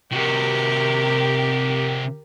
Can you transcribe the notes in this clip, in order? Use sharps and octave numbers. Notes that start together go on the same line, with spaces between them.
C3 F#4 G4 A#4